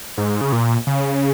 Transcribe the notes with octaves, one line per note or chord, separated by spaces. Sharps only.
G#2
C#3
A#2
C#3